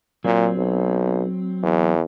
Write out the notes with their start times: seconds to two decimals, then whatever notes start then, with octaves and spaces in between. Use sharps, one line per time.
0.24 A#2 F#3 C4
0.57 B1
1.62 E2